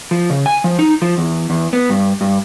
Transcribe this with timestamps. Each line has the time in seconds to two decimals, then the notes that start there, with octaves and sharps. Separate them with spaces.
0.11 F3
0.30 C#3
0.46 G#5
0.64 F3
0.79 D#4
1.02 F3
1.18 E2
1.50 E2
1.73 B3
1.90 G2
2.21 G2